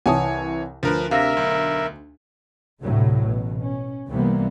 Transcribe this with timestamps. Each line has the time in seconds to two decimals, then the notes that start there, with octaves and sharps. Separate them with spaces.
0.06 C2 E3 C#5 F#5 G#5 A5 D#6
0.83 D2 F3 A#4 B4
1.11 C3 A#4 E5 F5 A#6
1.37 B1
2.83 D2 A2 C3 F#3
3.23 A1 B2
3.60 C#4
4.09 C2 C3 E3 G3 A#3 B3